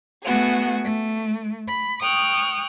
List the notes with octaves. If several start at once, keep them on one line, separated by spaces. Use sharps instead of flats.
A3 B3 F#4 G#4
A3
B5
G5 C#6 D#6 F6 F#6